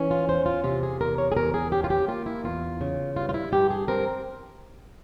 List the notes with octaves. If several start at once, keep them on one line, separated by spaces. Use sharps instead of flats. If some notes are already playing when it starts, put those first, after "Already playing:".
Already playing: E3 C#4
F4
E2 C5
F4
C3 F4
G#4
E2 A#4
C#5
G#4
E2 A#4
G#4
C#4 G4
F4
G4
A#3 F4
E4
E2 F4
C#3
G2 F4
F4
E4
G2 G4
G#4
C4 A#4